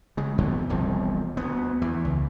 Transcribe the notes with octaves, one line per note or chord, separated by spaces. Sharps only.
C#3 G#3
F2 B2 D3 E3
E1 C2 F3
D2 B3
E2 E3
C#2